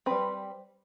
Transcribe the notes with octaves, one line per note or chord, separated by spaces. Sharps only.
G3 C4 B4